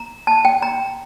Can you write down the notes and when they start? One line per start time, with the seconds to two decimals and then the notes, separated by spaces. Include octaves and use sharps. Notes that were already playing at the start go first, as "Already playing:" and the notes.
Already playing: A#5
0.27 A5
0.45 G5
0.62 A#5